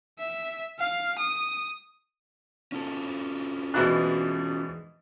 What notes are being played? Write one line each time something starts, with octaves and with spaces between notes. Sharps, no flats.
E5
F5
D#6
C#4 F4 A4
G#2 B2 E3 D4 F#6